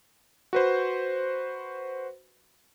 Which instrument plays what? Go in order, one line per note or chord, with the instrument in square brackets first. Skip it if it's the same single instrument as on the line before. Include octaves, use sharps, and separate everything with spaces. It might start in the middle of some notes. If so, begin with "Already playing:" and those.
[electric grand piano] F#4 B4 C5